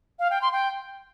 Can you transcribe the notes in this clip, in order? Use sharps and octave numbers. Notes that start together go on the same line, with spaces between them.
F5
G5
C6
G5